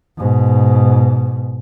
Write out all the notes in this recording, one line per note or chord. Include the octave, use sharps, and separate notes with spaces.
G#2 B2